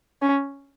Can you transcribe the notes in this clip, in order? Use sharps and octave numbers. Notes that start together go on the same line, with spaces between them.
C#4